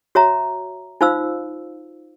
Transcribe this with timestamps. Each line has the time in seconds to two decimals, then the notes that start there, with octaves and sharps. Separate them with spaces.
0.15 F#4 C#5 E5 A#5
1.01 D#4 F4 C5 F5 E6